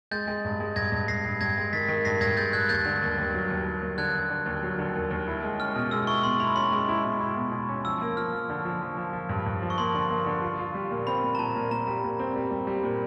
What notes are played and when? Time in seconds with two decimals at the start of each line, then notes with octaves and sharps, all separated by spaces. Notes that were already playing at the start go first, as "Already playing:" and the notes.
0.11 G#3 G6 A6
0.28 G#3
0.45 G2
0.60 G#3
0.76 G2 G#6 A#6
0.92 G2
1.08 G2 A#6 C7
1.25 G2
1.41 G2 G#6 A#6
1.57 G#3
1.73 D#3 A6 B6
1.88 D#3
2.05 G2 A#6 C7
2.21 G2 G#6 A#6
2.37 G#3 G6 A6
2.53 G2 F#6 G#6
2.69 D#2 G6 A6
2.86 D3
3.02 D#2
3.18 D#2
3.34 F#3
3.50 D#2
3.66 D#2
3.82 D#2
3.98 D3 F#6 G#6
4.15 D#2
4.30 D3
4.46 D#2
4.62 F#3
4.79 D3
4.95 D#2
5.11 D#2
5.28 E4
5.43 G#3
5.59 C#4 F6
5.75 B2
5.91 G#3 E6
6.07 E4 C#6
6.23 B2 C6
6.40 E4 B5
6.55 C#4 C6
6.72 G#3
6.89 E4
7.04 B2
7.21 E4
7.36 B2
7.52 B2
7.69 C#4
7.84 F3 E6
8.01 A#3
8.17 F3 F6
8.33 F3
8.50 D3
8.65 F3
8.81 F3
8.97 F3
9.13 F3
9.29 G2
9.46 G2
9.62 F3
9.70 C#6
9.78 A#3 C6
9.94 D3
10.10 A#3
10.26 D3
10.42 F4
10.59 F4
10.74 G3
10.90 A#2
11.07 C4 B5
11.22 A#2
11.35 A#5
11.38 A#2 A5
11.55 A#2
11.71 A#2 A#5
11.87 G3
12.04 A#2
12.19 C4
12.36 G3
12.51 G3
12.67 G3
12.83 A#2